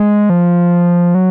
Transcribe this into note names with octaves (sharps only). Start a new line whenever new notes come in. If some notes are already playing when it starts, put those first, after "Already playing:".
Already playing: G#3
F3
F#3